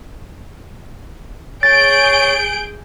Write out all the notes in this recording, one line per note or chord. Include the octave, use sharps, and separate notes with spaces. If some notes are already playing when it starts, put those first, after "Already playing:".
G#4 C#5 G6 A6 D7